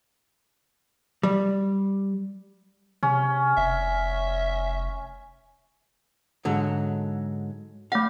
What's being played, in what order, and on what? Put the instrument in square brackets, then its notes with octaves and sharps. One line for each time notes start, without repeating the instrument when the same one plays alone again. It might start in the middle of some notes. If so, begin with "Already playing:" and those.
[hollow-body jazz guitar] G3
[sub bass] C3 [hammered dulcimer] C#4
[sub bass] F1 [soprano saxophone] E5
[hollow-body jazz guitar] G#2 D3 F#3
[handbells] A3 F#5 [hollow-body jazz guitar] F5